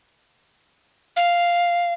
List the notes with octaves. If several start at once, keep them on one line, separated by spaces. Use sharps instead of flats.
F5